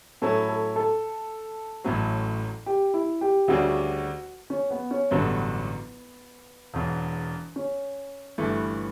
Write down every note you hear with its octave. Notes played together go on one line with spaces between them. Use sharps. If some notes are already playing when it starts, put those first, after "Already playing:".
A2 F#3 C#4 E4 A4
A4
A4
A1 A2 F#3
G4
E4
G4
D2 C#3 G3 D4 F#4
C#4
B3
C#4
A1 G2 D3 F#3 B3
E1 E2 C#3
C#4
G1 G2 E3 A3